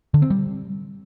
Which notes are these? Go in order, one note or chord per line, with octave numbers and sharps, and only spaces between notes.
D3
C4
G3